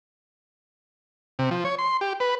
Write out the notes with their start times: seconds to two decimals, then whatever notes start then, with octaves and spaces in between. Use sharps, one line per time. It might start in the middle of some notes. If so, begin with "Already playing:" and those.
1.39 C3
1.51 F3
1.65 C#5
1.79 C6
2.01 G4
2.20 B4